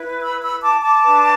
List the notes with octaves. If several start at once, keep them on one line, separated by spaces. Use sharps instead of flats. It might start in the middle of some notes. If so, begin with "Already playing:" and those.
Already playing: E4 B4
B5 E6
B5 E6
A5 D6
A5 D6
D4 B4